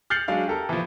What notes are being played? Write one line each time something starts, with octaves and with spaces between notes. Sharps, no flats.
F6 G6 A6 C7 C#7 F#7
F#3 G#3 D4 F5
G4 A4 A#4
E3 F3